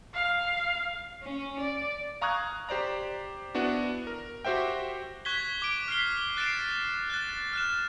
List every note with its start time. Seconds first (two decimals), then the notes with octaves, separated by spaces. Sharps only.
0.14 F5
1.23 C#4
1.60 D5
2.21 F5 A#5 C#6 D#6 F#6 G#6
2.69 G4 C5 D5 A#5
3.55 B3 D4 E4 F#4
4.07 A#4
4.45 F#4 G4 C5 E5 G5
5.25 C#6 F#6 G#6 B6 G7
5.62 D6 D7
5.88 F6 B6 C7 G7
6.37 F#6 A6 C7 D7 E7
7.10 F#6 A6
7.53 F6 F#6 E7